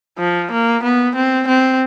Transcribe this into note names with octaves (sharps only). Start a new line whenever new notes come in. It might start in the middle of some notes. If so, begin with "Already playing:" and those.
F3
A#3
B3
C4
C4